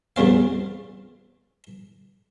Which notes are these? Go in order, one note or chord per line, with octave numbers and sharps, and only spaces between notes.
E2 A2 G3 C4 F5